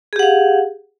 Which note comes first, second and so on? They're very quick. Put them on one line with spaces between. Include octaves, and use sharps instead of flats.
G#4 G4 F#5 F5